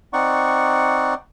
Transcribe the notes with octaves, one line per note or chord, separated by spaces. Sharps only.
C4 D#4 D5 F#5 C#6